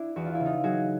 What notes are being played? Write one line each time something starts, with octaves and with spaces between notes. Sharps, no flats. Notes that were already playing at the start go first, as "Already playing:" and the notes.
Already playing: D4 E4
E2 F#4
F4
C#3 E4
D#4 F4
F#3 F#4 G#4